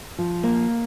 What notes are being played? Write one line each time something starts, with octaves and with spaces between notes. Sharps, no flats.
F3
A#3